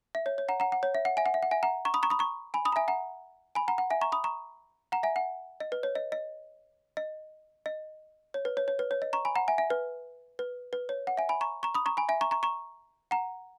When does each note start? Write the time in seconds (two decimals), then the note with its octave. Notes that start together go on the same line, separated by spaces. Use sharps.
0.15 E5
0.26 C#5
0.38 C#5
0.49 F#5 A#5
0.60 F#5 A#5
0.72 F#5
0.83 C#5
0.95 E5
1.05 F#5
1.17 E5 G#5
1.26 F#5
1.34 E5
1.43 F#5
1.51 E5 G#5
1.63 F#5 A#5
1.85 A#5 C#6
1.94 B5 D#6
2.03 A#5 C#6
2.10 B5 D#6
2.19 A#5 C#6
2.54 G#5 B5
2.65 B5 D#6
2.72 A#5
2.76 E5 G#5
2.88 F#5 A#5
3.55 G#5 B5
3.68 F#5 A#5
3.78 F#5
3.90 E5 G#5
4.01 A#5 C#6
4.12 B5 D#6
4.24 A#5 C#6
4.92 F#5 A#5
5.03 E5 G#5
5.16 F#5
5.60 D#5
5.72 B4
5.83 C#5
5.95 D#5
6.12 D#5
6.97 D#5
7.66 D#5
8.34 C#5
8.45 B4
8.57 C#5
8.68 C#5
8.79 B4
8.91 C#5
9.02 D#5
9.13 A#5 C#6
9.25 G#5 B5
9.36 F#5 A#5
9.48 E5 G#5
9.58 E5 G#5
9.70 B4
10.39 B4
10.73 B4
10.89 C#5
11.07 F#5
11.17 E5 G#5
11.29 G#5 B5
11.41 A#5 C#6
11.63 A#5 C#6
11.75 B5 D#6
11.86 A#5 C#6
11.97 G#5 B5
12.09 E5 G#5
12.21 A#5 C#6
12.31 A#5 C#6
12.43 A#5 C#6
13.11 F#5 A#5